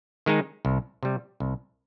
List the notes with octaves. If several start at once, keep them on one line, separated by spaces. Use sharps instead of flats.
D#3 G#3 D#4
C2
C3 G3
C2